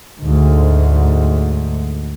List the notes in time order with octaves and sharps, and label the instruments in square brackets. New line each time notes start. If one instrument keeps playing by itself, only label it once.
[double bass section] D2 G#2